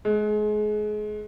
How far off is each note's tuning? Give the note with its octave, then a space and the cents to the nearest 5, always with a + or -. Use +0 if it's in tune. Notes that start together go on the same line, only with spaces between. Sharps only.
G#3 +30